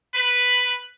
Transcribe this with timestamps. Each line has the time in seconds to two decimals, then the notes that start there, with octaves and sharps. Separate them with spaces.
0.14 B4